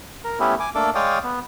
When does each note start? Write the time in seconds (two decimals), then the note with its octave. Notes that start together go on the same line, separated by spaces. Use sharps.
0.25 A#4
0.40 A3 B3 C#4 E4 G4
0.60 G#5 D6
0.75 A3 A#3 D4 A4 D6
0.95 G#3 C#5 D5 F5 G5 D#6
1.23 B3